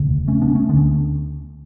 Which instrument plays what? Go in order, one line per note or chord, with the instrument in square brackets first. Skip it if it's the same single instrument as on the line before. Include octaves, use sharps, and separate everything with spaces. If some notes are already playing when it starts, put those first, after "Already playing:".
Already playing: [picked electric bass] E1 D2 C#3
A3 C#4
B3 D4
A3 C#4
D2 D3 B3 D4